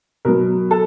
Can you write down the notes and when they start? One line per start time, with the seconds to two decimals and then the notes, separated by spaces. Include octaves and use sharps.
0.25 B2 F#3 A#4
0.71 A4